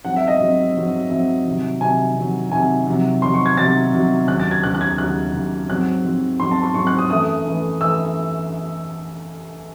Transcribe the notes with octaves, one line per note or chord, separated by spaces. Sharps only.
G#2 F#3 C4 F#5
E5
D#5
G#2 F#3 C4
G#2 F#3 C4
G#2 F#3 C4 E5
C3 D#3 F#3
C3 D#3 F#3 G#5
C3 D#3 F#3
C3 D#3 F#3 G#5
C3 D#3 F#3
C3 D#3 F#3 C6
C#6
G#6
C3 D#3 F#3 A6
C3 D#3 F#3
D#2 C#3 F#3 F#6
A6
G#6
D#2 C#3 F#3 F#6
F#6
G#6
D#2 C#3 F#3 F#6
D#2 C#3 F#3
G#2 F#3 C4 F#6
G#2 F#3 C4
G#2 F#3 C4 C6
A5
C6
G#2 F#3 C4 C#6
F#6
D#6
F#2 E3 A3 D#6
F#2 E3 A3
E3 A3 E6